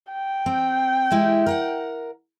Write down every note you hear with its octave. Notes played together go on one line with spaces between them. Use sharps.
G5
C4
G#3 E4 G4
A#4 F5 F#5